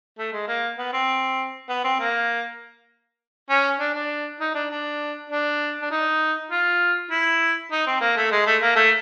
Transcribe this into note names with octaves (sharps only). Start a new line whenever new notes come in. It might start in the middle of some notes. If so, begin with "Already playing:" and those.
A3
G#3
A#3
B3
C4
B3
C4
A#3
C#4
D4
D4
D#4
D4
D4
D4
D4
D#4
F4
E4
D#4
C4
A#3
A3
G#3
A3
A#3
A3